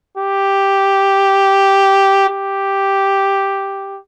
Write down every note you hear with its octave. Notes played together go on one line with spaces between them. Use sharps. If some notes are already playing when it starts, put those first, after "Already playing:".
G4
G4